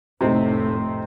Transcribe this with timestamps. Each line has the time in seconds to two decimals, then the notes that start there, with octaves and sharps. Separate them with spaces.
0.21 F1 A2 C3 A3 C4 D#4